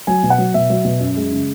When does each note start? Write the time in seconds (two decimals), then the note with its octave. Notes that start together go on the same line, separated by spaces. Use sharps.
0.07 F#3 G#5
0.23 B2
0.30 F#5
0.38 F#3
0.54 B2 E5
0.70 F#3
0.85 B2
1.00 F#2
1.16 G#3
1.32 C#3